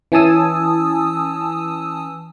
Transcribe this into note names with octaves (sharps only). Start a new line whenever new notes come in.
E3 C#4 G#5 A5 D#6 E6